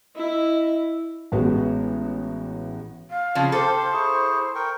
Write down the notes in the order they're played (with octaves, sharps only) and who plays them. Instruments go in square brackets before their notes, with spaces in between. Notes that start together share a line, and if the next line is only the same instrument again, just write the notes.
[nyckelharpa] E4 [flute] D#5
[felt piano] A1 G#3 B3 F#4
[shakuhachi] F5
[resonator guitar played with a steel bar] C#3 F3 [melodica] A5
[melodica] G4 F5 C6 [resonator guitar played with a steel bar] A4 [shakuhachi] C5
[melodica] E4 G#4 C#6
A#4 G5 C#6